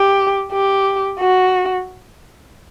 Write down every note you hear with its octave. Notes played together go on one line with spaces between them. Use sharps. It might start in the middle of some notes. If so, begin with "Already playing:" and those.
Already playing: G4
G4
F#4